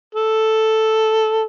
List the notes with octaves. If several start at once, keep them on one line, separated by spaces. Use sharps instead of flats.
A4